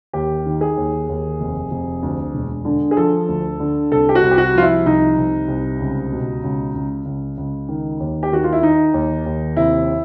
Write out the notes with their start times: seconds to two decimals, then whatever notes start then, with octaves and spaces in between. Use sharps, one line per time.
0.13 D#2 G4
0.46 D#3
0.61 G#4
0.77 D#2
1.09 D#2
1.40 F1
1.71 F1
2.03 D2
2.34 E1
2.65 D3
2.91 G#4
2.97 F3 A4
3.28 D2
3.60 D3
3.91 C2 A4
4.09 G4
4.15 F#4
4.22 C2
4.31 G4
4.38 F#4
4.55 F3 F4
4.62 E4
4.85 C2 D#4
5.17 C2
5.48 C2
5.80 C#2
6.12 B2
6.43 C#2
6.74 C#2
7.06 C#2
7.38 C#2
7.69 D#3
8.00 D#2
8.23 G4
8.32 D#3 F#4
8.44 F4
8.53 E4
8.63 D#3 D#4
8.94 D#2
9.26 D#2
9.57 C3 E4